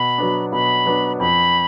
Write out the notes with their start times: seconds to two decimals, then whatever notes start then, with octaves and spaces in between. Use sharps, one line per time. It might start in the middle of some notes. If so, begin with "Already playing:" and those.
Already playing: B2 B5
0.18 F#3 B3 D4
0.52 B2 B5
0.86 F#3 B3 D4
1.20 F2 B5